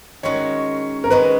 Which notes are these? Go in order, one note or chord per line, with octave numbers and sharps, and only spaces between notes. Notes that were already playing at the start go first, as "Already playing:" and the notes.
D#3 G#3 C#4 F#4 C#5
A#4
D#3 G#3 C#4 B4